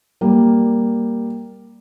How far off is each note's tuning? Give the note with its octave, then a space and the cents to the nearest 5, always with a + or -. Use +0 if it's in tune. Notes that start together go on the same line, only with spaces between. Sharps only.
G3 +0 A#3 +0